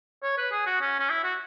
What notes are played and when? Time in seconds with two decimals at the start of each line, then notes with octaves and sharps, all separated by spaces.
0.23 C#5
0.38 B4
0.51 G#4
0.66 F#4
0.81 C#4
0.99 C#4
1.10 E4
1.23 F#4